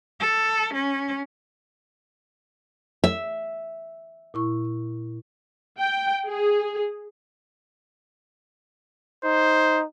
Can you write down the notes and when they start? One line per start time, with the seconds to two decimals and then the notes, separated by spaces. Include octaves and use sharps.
0.20 A4
0.74 C#4
3.04 E5
4.34 A#2 E4 C#6
5.80 G5
6.27 G#4
9.24 D#4 C5